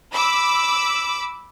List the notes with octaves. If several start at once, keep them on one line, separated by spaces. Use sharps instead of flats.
B5 D6 E6